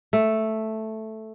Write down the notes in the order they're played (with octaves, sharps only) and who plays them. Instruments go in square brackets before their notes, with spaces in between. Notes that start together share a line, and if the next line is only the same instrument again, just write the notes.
[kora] A3